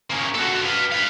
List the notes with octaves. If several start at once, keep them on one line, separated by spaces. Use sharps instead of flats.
A#3 C#4
F#4 A4
B4 F5
B4 F5